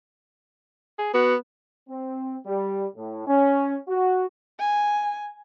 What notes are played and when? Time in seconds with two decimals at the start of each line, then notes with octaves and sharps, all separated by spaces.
0.99 G#4
1.14 B3 F#4
1.89 C4
2.46 G3
2.96 A2
3.27 C#4
3.88 F#4
4.59 G#5